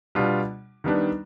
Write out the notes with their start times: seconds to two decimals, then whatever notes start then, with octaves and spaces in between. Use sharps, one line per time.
0.15 B2 G3 B3 D4 F4
0.84 D#3 G3 B3 D4